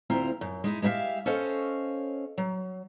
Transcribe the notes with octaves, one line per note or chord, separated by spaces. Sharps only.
D2 C4 E4 F4 A#5
F#2
G#3 D#4 E4
G#3 G4 A#4 E5 F5
C#4 A4 C5 C#5 D#5 F5
F#3